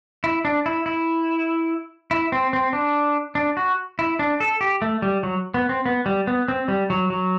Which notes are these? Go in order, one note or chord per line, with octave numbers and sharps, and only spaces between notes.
E4
D4
E4
E4
E4
C4
C4
D4
D4
F#4
E4
D4
A4
G4
A3
G3
F#3
B3
C4
B3
G3
B3
C4
G3
F#3
F#3